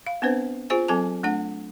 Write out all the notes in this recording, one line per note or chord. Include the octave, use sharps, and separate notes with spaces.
F5
B3 C4 D4 B4 C5
F4 G#4 C5 G#5
F#3 C4 A4 G#5 A5
A3 D4 F#5